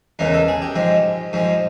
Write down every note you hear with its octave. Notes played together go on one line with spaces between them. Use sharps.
E2 C#3 E3 G#3 A#4
A4
G#4
G4
G#2 F3 G#3
G#2 F3 G#3